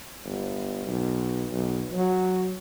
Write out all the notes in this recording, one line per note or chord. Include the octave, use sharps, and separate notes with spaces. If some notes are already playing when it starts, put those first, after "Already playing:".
G1
B1
B1
F#3